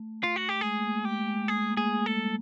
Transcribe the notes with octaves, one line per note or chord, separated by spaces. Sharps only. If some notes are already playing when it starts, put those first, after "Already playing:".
Already playing: A3
F4
F#4
G4
A3
G#3 G#4
A#3
A3
G#3 G4
G#3
A3 G#4
A#3
G#4
G#3
A4
G3